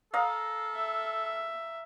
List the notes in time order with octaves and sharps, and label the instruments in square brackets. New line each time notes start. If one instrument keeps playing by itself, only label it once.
[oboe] A4 [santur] F5 A#5 D#6
[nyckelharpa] E5